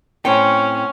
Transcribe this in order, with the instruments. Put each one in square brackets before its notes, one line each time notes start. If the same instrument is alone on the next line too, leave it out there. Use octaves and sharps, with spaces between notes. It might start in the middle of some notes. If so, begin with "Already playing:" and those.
[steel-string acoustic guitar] A2 C4 G5 [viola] C#4